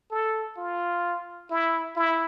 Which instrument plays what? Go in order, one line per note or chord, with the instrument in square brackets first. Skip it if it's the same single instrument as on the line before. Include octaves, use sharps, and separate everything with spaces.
[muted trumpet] A4
F4
E4
E4